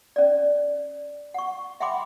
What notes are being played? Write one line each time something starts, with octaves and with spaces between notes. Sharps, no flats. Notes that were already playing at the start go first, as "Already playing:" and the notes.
C#4 D5
F#5 C#6
E5 F#5 G5 B5 C6 D6